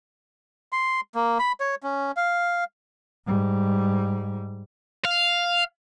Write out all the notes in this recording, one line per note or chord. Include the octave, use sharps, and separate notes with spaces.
C6
A#3
B5
C#5
C#4
F5
G#2 G3
F5